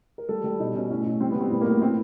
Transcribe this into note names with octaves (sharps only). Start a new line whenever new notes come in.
A#4
G3 A4
G3
B2 D#4
B2 C#4
A2 C#4
A2
G3 C4
B3
G3 C4
A2 B3
A#3
A2
B3
A2 C4